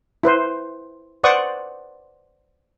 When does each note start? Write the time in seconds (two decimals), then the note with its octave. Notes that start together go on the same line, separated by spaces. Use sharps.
0.23 E4 B4 C5
1.23 B4 C5 D5 F#5 C#6 D#6